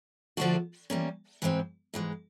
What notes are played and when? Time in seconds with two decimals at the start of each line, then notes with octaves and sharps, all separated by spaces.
0.37 D3 F3 A3 D4 F#4
0.90 E3 G3 A#3 C#4
1.42 G#2 E3 G#3 C4
1.94 G#2 E3 G#3